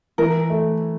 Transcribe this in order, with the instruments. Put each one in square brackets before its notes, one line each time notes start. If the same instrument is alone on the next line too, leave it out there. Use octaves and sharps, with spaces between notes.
[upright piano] E3 [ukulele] A#4
[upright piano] A3